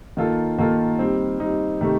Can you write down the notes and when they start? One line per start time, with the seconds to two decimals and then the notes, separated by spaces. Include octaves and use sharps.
0.17 D#3 A#3 F4 A4
0.58 D#3 A#3 F4 A4
0.99 G3 C4 D#4
1.40 G3 C4 D#4
1.81 C3 D#3 A3 D#4 G4